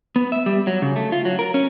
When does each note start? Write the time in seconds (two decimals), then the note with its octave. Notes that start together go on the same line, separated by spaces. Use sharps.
0.16 B3
0.32 E5
0.46 G3
0.67 F#3
0.82 C#3
0.96 A3
1.12 F4
1.25 F#3
1.39 A#4
1.54 C#4